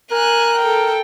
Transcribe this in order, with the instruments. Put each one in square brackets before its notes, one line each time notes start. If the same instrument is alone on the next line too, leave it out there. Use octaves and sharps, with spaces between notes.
[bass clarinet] A#4 [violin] G#5 F#6
[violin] A4 G5